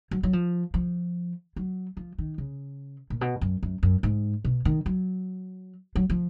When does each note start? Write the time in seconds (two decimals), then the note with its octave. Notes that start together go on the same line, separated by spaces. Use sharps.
0.11 F#3
0.23 F#3
0.33 F3
0.74 F3
1.56 F#3
1.97 F3
2.18 D#3
2.38 C#3
3.10 A#2
3.21 B2
3.41 F#2
3.63 F#2
3.83 F#2
4.03 G#2
4.45 B2
4.65 D#3
4.86 F#3
5.95 F#3
6.10 F3